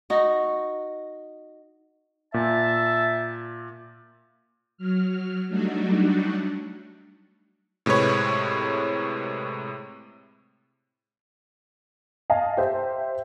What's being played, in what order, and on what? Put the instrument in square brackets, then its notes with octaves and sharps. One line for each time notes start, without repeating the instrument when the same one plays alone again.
[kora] D#4 F#4
[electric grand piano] A#2 [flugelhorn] E5 [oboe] A5
[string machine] F#3 F6
F#3 G3 A3 D4 D#4 F#4
[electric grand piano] A2 C3 G#3 B4 C#5
[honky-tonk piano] D#5 F5 G#5 A5
G4 C5 E5